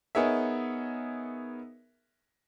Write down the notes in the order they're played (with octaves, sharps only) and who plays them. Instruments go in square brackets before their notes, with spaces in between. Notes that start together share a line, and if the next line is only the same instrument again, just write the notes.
[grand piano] B3 D#4 G#4 A#4 C#5 E5